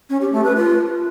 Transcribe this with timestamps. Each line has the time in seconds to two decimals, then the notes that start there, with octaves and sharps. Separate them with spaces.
0.10 C#4
0.21 G4
0.33 A3
0.44 B4
0.56 F4